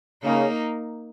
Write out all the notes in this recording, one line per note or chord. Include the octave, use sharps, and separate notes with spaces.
C#3 A#3 D#4